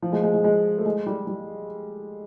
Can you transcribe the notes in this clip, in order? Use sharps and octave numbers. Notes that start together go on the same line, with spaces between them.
F3
G#3
G#3
G#3
G#3
A3
G#3
G3
G3